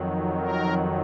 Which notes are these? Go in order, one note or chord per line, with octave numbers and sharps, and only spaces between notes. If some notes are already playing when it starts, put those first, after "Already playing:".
Already playing: F2 D#3 F#3
A#4